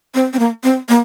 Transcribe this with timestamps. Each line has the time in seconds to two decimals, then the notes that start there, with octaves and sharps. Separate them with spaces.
0.14 C4
0.33 C4
0.39 A#3
0.64 C4
0.89 A#3